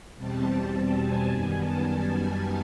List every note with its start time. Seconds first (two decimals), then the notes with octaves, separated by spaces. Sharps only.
0.17 E2 B2 G3 C4 A5
0.45 A5
1.02 G#5
1.30 F#2 D#3 G3 B3 G#5
1.59 A5
1.87 G#5